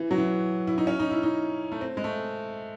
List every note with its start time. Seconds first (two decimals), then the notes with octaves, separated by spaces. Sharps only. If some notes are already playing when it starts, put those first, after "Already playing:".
Already playing: E3
0.11 F#3
0.18 E3
0.67 E4
0.78 D#4
0.87 C#4
1.00 D#4
1.11 E4
1.23 D#4
1.72 A3
1.81 C4
1.97 G#3
2.04 A3